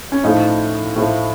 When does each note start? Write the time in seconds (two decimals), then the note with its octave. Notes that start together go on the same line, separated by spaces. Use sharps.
0.12 C#4
0.23 A2 F3 A3 D#4
0.96 A2 F3 A3